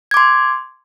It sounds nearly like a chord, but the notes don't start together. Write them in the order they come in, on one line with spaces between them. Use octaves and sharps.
G#6 D6 C6